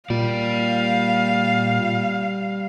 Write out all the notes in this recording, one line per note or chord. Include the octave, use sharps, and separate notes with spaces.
A#2 G3 D5 F5